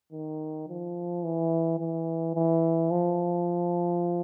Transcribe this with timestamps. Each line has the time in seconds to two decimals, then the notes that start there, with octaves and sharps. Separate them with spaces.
0.12 D#3
0.68 F3
1.24 E3
1.79 E3
2.35 E3
2.91 F3